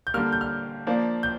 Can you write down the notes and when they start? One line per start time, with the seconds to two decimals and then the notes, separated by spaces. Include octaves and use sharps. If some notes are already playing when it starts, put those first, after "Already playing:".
0.07 G6
0.14 D3 G3 A#3 F6
0.32 G6
0.41 F6
0.87 F3 A#3 D4
1.23 G6